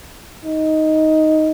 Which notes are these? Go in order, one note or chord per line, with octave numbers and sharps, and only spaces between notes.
D#4